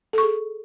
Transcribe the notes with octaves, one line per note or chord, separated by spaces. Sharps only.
G#4 A4 C#6